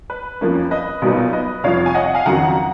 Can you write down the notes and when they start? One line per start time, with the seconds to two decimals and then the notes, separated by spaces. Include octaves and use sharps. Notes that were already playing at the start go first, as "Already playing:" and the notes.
0.10 B4
0.41 F2 F3 A#3 C#4
0.71 B4 D#5
1.02 B1 A#2 F#3 B3 D#4
1.33 B4 D#5
1.64 F1 F2 F3 C#5 F5
1.86 G#5
1.94 D#5 F#5
2.05 D#5 F#5
2.15 F5 G#5
2.26 F#1 F2 D#3 F#3 F#5 A#5